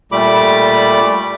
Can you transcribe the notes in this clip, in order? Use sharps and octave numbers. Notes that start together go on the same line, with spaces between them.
A#2 G3 A3 B5 D6